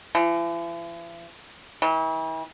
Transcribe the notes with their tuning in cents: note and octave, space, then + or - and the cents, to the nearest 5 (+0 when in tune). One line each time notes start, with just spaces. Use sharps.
E3 +45
E3 -40